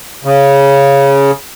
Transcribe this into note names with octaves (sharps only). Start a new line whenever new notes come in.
C#3